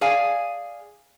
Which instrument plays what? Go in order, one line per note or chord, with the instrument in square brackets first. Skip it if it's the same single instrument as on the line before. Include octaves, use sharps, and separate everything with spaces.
[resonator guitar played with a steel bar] G#4 D5 F5 G#5